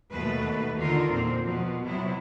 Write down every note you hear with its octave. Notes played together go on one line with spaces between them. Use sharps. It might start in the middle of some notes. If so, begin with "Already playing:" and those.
D#2 B2 A3 B4
D3 D#3 D#4 F4 A4 A#4
E2 A#2 A#3 C4
B2 F3
C3 F#3 B3 E4